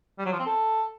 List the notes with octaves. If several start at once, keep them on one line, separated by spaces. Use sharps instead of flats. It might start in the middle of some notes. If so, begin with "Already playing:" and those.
G3
F#3
F3
C4
A4